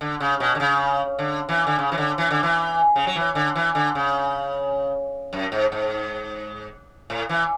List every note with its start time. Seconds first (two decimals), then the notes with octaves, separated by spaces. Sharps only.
0.01 D3
0.20 C#3
0.40 B2
0.55 D3
0.60 C#3
1.19 D3
1.49 E3
1.67 D3
1.79 C#3
1.92 E3
1.98 D3
2.18 E3
2.31 D3
2.43 E3
2.96 C#3
3.07 F#3
3.16 E3
3.35 D3
3.56 E3
3.75 D3
3.95 C#3
5.33 F#2
5.52 G#2
5.72 G#2
7.10 A2
7.29 E3